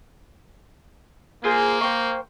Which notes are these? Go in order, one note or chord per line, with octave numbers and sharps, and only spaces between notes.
A#3 F4 G#4 C5
C5 G5 C#6